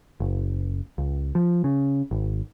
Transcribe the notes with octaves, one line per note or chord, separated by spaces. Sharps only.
F#1
C#2
F3
C#3
G#1